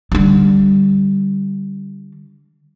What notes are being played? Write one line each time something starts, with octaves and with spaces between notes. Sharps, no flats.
D3 G3